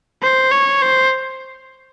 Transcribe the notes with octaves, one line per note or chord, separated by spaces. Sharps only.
C5
C#5
C5